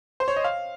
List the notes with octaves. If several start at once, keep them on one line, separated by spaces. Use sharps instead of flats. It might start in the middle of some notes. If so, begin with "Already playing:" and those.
C5
C#5
D#5
F5